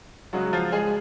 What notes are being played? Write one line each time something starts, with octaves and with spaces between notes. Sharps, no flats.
C#3 F#3 G#3 F#4
F3 F4
G#3 G#4